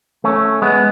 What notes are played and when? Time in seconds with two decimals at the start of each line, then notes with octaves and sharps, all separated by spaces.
0.24 A3 C#4
0.62 G#3 B3